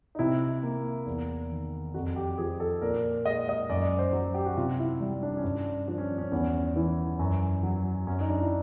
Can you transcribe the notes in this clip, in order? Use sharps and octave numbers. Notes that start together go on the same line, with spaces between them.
D#4
C3 E4
A#3
E2
D#3
F2 F#4
G4
F3 G#4
A4
A#2 A#4
G#3 D#5
D#5
F#2 D5
C5
F#3
G4
F#4
C3 F4
E4
G3
D4
C#4
G2 D4
F3 D4
C#4
C#4
E2
E3
F#2
F#3
F#2 C#4
D#4
D4
E4